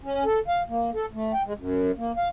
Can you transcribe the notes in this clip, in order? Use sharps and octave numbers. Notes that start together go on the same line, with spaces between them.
C#4
A4
F5
A#3
A4
A3
G5
G#3
F#2
A#3
F5